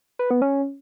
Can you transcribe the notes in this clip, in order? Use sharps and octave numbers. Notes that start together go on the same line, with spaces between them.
B4
B3
C#4